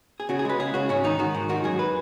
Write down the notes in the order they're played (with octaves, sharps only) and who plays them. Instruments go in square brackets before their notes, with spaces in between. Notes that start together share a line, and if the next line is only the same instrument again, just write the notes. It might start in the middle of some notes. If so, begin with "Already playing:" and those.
[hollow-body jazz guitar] G#4
C#3 F#4
G#4
G#3 B4
C#3 G#4
C#3 F#4
G#2 C#4
D#3 D#4
D#3 F#4
G#2
D#3 F#4
F#2 G#4
B4